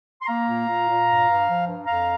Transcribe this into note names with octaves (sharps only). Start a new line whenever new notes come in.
C6
A#3 F5 A#5
A#2
A#2
A#2
G2
G2
F3
G2
F2 F5 A#5